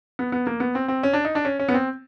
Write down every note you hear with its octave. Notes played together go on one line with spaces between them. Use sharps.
B3
B3
A#3
B3
C4
C4
C#4
D4
D#4
D4
C#4
C#4
B3
C4